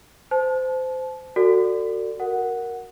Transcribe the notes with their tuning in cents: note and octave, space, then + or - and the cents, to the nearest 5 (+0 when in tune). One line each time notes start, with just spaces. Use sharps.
C5 -25 A5 -30
F#4 +0 A4 +35 D5 +0
A#4 +0 F#5 +0